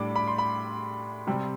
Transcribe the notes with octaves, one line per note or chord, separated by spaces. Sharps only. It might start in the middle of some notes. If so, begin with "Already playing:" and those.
Already playing: A2 G3 D4 B5 D6
B5
C6
B5
C3 G3 C4